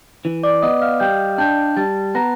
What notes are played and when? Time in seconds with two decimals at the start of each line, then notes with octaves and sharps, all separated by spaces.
0.25 E3
0.43 D5 D6
0.62 B3 D#5 D#6
0.81 F5 F6
1.00 G3 G5 G6
1.38 D4 G5 G6
1.76 G3 A5 A6
2.15 B3 A#5 A#6